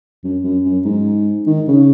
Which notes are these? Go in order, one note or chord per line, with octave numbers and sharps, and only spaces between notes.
F#2
F#2
F#2
G#2
D#3
C#3